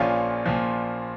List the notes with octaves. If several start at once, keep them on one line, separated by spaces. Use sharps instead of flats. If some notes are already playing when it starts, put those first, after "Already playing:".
Already playing: A#1 A#2 F3 C#4 F4
A#2 F3